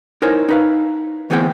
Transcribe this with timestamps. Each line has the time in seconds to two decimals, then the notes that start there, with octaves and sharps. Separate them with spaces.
0.22 D#4 E4 A#4 C5 C#5 G#5
0.49 D#4 B4 F5
1.30 D2 E3 B3 C4 G#4 G5